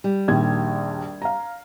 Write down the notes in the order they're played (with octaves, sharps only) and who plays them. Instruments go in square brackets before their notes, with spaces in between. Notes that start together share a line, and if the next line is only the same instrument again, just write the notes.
[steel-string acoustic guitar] G3
[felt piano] A#1 D#2 G#6
F5 A#5